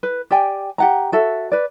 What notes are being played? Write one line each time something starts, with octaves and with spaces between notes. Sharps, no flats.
B4
G4 D5 G5 G#5
G4 F#5 A#5
F#4 A4 E5
B4 D5